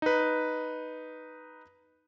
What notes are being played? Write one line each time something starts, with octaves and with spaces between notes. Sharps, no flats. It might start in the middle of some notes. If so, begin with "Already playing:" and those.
D#4 B4